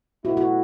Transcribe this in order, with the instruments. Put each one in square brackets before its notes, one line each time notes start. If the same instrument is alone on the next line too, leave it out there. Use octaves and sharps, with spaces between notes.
[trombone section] B2 A3 E4 [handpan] F#4
[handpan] F#4